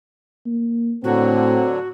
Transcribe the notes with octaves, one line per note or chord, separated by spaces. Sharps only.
A#3
A2 D3 F#3 C4 F#4